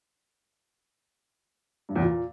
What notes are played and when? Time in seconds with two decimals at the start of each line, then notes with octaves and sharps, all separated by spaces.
1.89 G2
1.96 E2
2.02 A#2